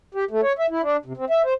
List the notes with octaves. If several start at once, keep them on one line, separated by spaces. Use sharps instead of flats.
G4
A3
C#5
E5
E4
D4
C3
C4
E5
C5